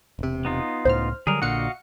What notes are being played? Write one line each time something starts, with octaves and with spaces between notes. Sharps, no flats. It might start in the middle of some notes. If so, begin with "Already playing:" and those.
E1 C3
B3 D#4 F4
C#2 A2 C5 F6
D3 F#3 G3 G#4 A#4
A#1 A#2 D3 F#4 D#5 F5 F#5 C#7